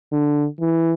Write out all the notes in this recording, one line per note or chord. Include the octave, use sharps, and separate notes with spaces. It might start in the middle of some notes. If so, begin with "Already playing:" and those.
D3
E3